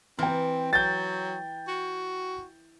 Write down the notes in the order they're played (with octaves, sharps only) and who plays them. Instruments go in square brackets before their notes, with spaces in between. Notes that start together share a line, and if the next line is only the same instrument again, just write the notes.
[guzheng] E3 [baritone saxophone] C4 [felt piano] G5 A#5 F6
[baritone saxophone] F#3 [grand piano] G6 A6
[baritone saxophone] F#4